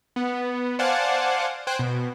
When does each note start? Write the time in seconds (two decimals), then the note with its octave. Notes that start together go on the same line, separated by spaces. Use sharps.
0.16 B3
0.79 C5 D5 F5 F#5 G#5 A5
1.67 C5 G5 G#5 F#6
1.79 B2